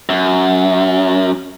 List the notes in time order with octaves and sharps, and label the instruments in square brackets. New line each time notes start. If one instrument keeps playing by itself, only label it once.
[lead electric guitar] F#2